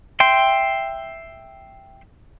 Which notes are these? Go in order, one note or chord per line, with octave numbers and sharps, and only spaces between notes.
E5 G5 C6